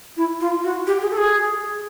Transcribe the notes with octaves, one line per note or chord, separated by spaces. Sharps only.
E4
F4
F#4
G4
G#4
A4
G#4